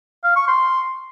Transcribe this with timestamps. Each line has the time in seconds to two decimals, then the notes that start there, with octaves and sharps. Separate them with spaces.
0.24 F5
0.36 C#6
0.48 C6